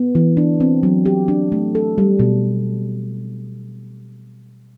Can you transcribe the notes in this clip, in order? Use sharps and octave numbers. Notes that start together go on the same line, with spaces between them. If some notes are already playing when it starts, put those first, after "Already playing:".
Already playing: B3
E3
D4
C4
F#3
G4
D4
A3
A4
G3
B2